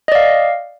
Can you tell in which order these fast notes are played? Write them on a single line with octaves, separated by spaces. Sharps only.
D#5 D5 F5